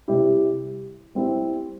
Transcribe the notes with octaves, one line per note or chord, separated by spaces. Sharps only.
C3 G3 E4 G4
G3 C4 E4 G4